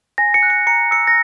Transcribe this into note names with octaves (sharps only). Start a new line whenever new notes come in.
G#5 A#6
C#7
F#6
C#7
A#5 C#7
E6 C#7
A#6